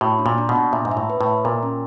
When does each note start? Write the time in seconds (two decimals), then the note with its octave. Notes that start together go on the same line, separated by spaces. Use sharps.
0.01 A2 F#4
0.19 D4
0.26 A#2
0.38 D4
0.49 B2
0.56 D4
0.73 A#2 E5
0.85 G#2
0.91 E5
0.97 A2
1.10 B4
1.21 A2
1.26 E5
1.44 A#2 A#4
1.63 C#4